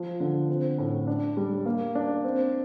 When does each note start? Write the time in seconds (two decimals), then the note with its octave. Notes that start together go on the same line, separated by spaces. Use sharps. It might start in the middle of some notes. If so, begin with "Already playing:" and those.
Already playing: F3
0.20 D3
0.49 C4
0.78 A2
1.07 D4
1.37 G3
1.66 A#3
1.95 D4
2.24 C4